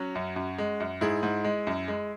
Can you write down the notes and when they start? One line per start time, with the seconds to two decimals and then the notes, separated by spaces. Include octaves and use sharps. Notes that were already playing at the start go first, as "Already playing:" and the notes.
Already playing: F#3 C#4 F#4
0.15 F#2
0.36 F#2
0.58 G#3
0.80 F#2
1.01 G#2 E4 G#4
1.23 G#2
1.44 G#3
1.67 F#2
1.88 G#3